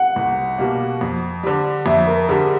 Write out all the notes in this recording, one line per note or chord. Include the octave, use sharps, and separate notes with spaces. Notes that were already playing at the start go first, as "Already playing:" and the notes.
Already playing: F#5
C2
B2 G3 A#3
F2
D3 G3
F2 E5
A#4
D3 G3 G#4